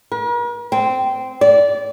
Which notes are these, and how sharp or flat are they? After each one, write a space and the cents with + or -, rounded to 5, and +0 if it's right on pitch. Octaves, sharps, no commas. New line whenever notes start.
A#4 +45
C4 -15
D5 -20